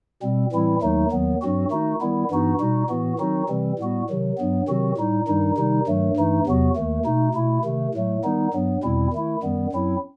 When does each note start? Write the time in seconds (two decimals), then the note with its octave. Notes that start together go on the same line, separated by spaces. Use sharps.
0.22 B2 G3 C4
0.52 A2 E3 G3 C4 E4
0.82 D#2 D#3 F#3 A3 D#4
1.11 D#2 D#3 F#3 B3
1.42 G2 F#3 C4 F#4
1.71 D#3 A3 D#4 F#4
2.01 D#3 G3 B3 E4
2.30 G2 E3 B3 D#4 F#4
2.60 B2 G3 D#4 F#4
2.89 A2 E3 B3 F#4
3.19 D#3 F#3 C4 D#4 F#4
3.49 C3 E3 G3 C4
3.79 A2 G3 B3 F#4
4.09 C3 D#3 F#3
4.38 G2 F#3 B3
4.68 C3 D#3 F#3 C4 F#4
4.97 A2 G3 D#4
5.27 G2 D#3 G3 D#4
5.57 C3 D#3 G3 D#4
5.87 G2 D#3 F#3 A3
6.16 G2 E3 A3 D#4
6.46 E2 C3 F#3 B3 F#4
6.76 D#2 D#3 A3
7.06 B2 A3 D#4
7.35 B2 A3 E4
7.64 C3 D#3 A3
7.94 A2 F#3 A3
8.24 D#3 G3 B3 D#4
8.53 G2 F#3 B3
8.83 E2 B2 G3 C4 E4
9.13 D#3 A3 E4
9.43 F#2 D#3 G3 B3
9.72 F#2 F#3 C4 E4